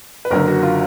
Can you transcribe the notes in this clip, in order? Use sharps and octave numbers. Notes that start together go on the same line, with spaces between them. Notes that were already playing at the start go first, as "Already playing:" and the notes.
B4
F#1 F#2 D3 A#4
F#4
F4